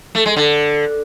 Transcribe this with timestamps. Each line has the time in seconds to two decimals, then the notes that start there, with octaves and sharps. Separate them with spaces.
0.15 A3
0.26 G#3
0.36 D3